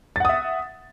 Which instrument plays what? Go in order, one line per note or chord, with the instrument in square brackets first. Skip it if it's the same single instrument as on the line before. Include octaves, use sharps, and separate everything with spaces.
[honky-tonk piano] A6
F#5
D#6
E5